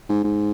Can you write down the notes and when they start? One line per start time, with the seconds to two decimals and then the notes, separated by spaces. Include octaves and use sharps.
0.09 G#2
0.24 G#2